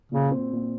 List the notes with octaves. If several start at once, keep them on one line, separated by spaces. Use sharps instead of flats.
A#2 C#3
C4
A#2